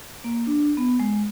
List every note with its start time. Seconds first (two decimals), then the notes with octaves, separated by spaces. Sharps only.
0.24 A#3
0.47 D4
0.77 B3
1.00 G#3